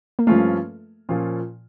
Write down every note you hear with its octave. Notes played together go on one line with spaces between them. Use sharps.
A#3
G2 F3 A3 C#4 F4
A#2 F3 C#4 F4